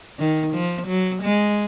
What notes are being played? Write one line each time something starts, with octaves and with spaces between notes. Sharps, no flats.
D#3
F3
F#3
G#3